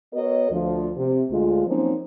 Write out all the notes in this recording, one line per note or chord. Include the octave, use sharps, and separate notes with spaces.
B3 F#4 A#4 C#5 D#5
D2 F3
C3
D2 G#3 F4
F3 F#3 A#3 C4 C#4 D#4